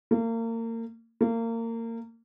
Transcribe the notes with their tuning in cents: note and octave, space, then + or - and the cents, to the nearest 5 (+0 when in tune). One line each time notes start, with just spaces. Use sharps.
A#3 -35
A#3 -30